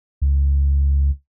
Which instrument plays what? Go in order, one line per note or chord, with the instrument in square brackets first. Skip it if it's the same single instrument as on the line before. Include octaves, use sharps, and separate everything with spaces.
[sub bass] C#2